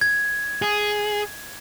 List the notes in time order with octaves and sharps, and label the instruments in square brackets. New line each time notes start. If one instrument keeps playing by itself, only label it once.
[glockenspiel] G#6
[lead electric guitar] G#4